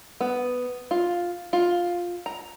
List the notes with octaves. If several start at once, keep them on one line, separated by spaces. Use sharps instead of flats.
B3
F4
F4
A#5